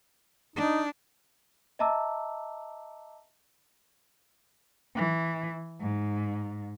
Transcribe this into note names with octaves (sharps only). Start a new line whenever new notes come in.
D4 D#4
D#5 E5 A5 A#5 D6 E6
E3
G#2